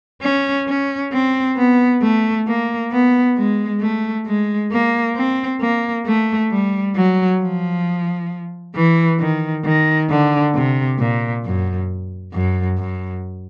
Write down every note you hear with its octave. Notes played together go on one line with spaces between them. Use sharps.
C#4
C#4
C4
B3
A3
A#3
B3
G#3
A3
G#3
A#3
C4
A#3
A3
G3
F#3
F3
E3
D#3
D#3
D3
C3
A#2
F#2
F#2
F#2